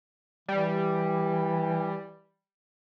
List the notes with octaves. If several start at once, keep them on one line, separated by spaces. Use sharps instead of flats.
E3 G3